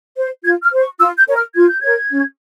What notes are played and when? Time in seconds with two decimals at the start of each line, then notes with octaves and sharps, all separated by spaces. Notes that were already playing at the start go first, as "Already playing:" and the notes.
0.17 C5
0.44 F4 G#6
0.63 F6
0.72 C5
0.81 C#6
1.00 F4 E6
1.18 G6
1.27 A#4 C#5
1.36 F6
1.55 F4 G#6
1.68 G6
1.81 A#4 C#5 G#6
2.10 C#4